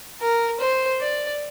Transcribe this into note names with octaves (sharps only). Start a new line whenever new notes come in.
A#4
C5
D5